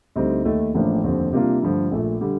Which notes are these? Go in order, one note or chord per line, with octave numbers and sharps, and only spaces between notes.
D2 D3 G3 C4 D#4
D#2 D#3 A3
A1 A2 F3 A#3 D4
F1 D#2 D3 F3 C4
C3 G3 A#3 D4 F4
G2 D3 F3 A3
A#1 A#2 A3
D3 G3